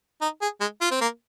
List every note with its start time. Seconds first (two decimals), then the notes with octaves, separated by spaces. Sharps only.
0.21 D#4
0.42 G#4
0.61 G#3
0.81 F4
0.91 C4
1.01 A#3